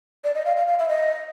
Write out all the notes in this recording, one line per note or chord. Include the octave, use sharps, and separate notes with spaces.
D5
D#5
F5
F5
F5
E5
D#5